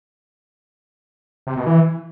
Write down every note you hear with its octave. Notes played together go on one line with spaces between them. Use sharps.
C3
B2
E3